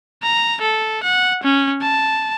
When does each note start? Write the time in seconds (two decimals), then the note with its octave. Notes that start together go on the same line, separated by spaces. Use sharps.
0.23 A#5
0.61 A4
1.03 F#5
1.43 C#4
1.82 A5